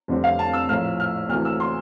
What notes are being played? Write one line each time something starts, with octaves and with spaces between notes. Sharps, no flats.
F1 F2 D3 G3 C4
F5
A5
E6
A#1 A2 F3 A#3 F6
F6
D2 C3 E3 A#3 F6
E6
C6